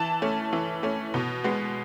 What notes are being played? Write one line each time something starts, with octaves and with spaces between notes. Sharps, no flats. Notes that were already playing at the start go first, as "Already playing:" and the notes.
Already playing: E3 A5
A3 C#4
E3
A3 C#4
B2
G#3 B3